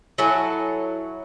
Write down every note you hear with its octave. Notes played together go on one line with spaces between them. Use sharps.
F#3 E4 A4 G#5